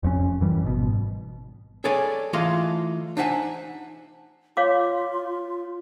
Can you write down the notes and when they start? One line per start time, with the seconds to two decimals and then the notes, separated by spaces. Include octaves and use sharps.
0.03 F1 F2 A#2 C#4
0.41 F#2 E3 G3
0.63 G#1 G#2 B2
1.84 G#4 A4 C#5 D5 G#5
2.33 E3 A3 F4 D#5 F5 C6
3.17 D4 D#4 C5 E5 F#5 G#5
4.57 F4 C#5 F5 D6